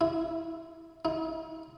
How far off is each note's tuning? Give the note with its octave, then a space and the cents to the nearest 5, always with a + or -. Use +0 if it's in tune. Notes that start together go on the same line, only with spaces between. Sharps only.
E4 -10
E4 -45